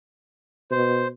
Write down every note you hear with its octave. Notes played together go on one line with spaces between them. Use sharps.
B2 C5